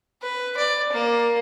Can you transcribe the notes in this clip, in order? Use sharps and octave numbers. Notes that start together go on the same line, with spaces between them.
B4
D5
A#3